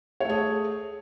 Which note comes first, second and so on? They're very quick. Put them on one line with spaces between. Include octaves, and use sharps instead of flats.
C#5 A3 G#4